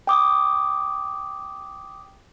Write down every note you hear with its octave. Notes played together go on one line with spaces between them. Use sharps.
G5 D6 D#6